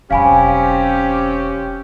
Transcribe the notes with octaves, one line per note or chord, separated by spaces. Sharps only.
E1 F#3 C4 C#4 G4 F5 G#5 B5